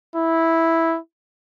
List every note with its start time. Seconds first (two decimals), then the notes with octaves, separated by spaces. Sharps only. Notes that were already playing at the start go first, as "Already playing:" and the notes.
0.16 E4